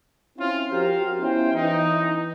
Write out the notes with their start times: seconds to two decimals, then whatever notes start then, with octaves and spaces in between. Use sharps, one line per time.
0.39 C4 C#4 E4 F4
0.71 F3 F#4 G4 A#4 C5 F5
1.21 B3 C#4 E4 F4 C5 G5
1.54 E3 D#4